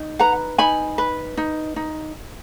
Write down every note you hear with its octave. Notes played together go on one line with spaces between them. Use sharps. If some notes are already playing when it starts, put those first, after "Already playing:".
Already playing: D#4
B4 F#5 A#5
D#4 G#5 B5
B4
D#4
D#4